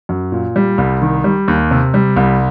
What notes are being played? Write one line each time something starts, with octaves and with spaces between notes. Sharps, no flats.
F#2
A#2
G3
C2
D#3
G3
D#2
C3
G3
C2